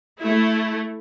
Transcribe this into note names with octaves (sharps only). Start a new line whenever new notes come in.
A3 E4